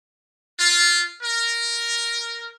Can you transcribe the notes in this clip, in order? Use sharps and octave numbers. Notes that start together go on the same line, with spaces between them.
F4
A#4